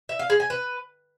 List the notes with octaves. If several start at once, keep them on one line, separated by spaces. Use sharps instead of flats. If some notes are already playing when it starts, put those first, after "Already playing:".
E5
F5
G#4
G#5
B4